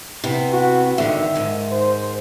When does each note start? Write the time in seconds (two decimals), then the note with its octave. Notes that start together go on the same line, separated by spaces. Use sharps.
0.24 C3 B3 E4
0.52 F#4
0.98 E2 D3 D#3 E5
1.34 G#2 D#3 G#3
1.72 C5